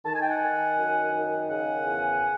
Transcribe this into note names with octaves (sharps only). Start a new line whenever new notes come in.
D#3 A5
G#5
G5
F#5 G#5
D#3
F#2
D#3
C#3 F#5 G#5
E2